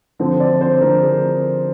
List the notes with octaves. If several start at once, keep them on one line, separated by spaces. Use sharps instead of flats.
D3 F3 C4
D5
C5
D3 F3 C4 A#4
G#4